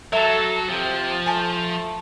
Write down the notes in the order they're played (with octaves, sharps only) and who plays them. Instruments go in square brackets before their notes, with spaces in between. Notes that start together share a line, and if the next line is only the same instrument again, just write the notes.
[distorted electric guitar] F#3 [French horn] A4 [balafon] E5
[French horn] C3 [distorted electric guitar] F3
[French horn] A3 [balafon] G#5 A5